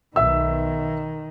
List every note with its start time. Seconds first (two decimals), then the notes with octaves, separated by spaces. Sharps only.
0.16 B1 D#3 E5 E6